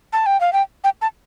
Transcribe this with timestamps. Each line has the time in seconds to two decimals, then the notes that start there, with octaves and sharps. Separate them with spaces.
0.13 A5
0.26 G5
0.40 F5
0.53 G5
0.84 G5
1.02 A5